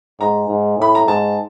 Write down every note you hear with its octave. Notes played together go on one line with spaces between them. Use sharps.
G#2 A#5
G#2
A2 B5
A#5
G#2 A5